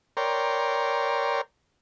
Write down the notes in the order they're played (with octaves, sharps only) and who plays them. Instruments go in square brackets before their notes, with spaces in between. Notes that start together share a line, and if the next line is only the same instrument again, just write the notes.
[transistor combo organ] A#4 C#5 D5 G5 A#5 C6